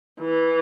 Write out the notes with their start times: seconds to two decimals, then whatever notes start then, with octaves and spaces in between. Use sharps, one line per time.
0.20 E3